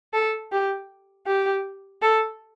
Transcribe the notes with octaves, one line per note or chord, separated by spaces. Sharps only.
A4
G4
G4
A4